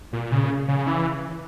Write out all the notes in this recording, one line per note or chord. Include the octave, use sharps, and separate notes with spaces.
A#2
C#3
C#3
E3